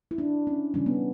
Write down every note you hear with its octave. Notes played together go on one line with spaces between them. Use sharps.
E4
D4
C#4
C#3 E3 G3 C#4
B3